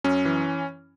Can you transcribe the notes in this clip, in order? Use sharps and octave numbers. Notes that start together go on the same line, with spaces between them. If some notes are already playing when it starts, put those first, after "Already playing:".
F#2 C#4
E3